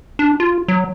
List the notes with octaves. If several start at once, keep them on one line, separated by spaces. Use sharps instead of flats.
D4
F4
F#3